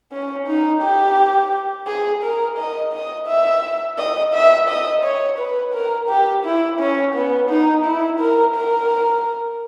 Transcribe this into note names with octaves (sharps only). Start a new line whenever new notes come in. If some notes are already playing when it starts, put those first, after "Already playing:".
C#4
D#4
G4
G#4
A#4
D#5
D#5
E5
D#5
E5
D#5
C#5
B4
A#4
G4
E4
C#4
B3
D#4
E4
A#4
A#4